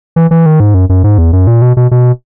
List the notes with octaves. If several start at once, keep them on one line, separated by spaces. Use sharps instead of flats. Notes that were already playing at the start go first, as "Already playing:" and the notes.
E3
E3
D#3
G#2
F#2
F#2
G#2
E2
F#2
A#2
B2
B2
B2